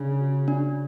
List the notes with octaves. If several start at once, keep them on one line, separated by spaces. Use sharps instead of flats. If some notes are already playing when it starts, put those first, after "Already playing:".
Already playing: C#3 D4
F#4
D4